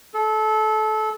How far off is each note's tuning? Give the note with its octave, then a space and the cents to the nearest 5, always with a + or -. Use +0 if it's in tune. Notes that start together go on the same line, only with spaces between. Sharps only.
A4 -25